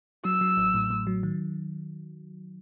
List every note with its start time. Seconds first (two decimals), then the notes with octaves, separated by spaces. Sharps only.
0.25 F#3 E6
0.41 F#3
0.57 A1
0.74 A2
0.90 A2
1.07 F#3
1.23 D#3